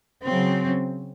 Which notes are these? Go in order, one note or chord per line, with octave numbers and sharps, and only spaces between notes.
C#3 F#3 C4